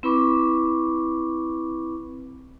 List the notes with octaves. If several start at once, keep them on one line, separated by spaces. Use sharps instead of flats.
C4 E4 B4 B5 C#6 D6